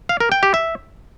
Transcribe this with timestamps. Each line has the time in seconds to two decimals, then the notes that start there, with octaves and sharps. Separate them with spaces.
0.09 F5
0.20 A#4
0.32 G5
0.43 G4
0.54 E5